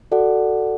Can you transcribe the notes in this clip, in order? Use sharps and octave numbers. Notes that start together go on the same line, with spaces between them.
F#4 A4 D5 F#5